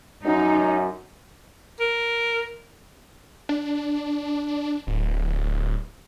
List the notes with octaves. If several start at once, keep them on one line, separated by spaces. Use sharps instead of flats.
F#2 D#4
A#4
D4
D1